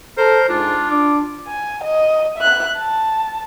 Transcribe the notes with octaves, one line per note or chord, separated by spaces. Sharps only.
A4 A#4 C5
G#2 D4 F4
D4 D6
G#5
D#5
E5 F#6
A5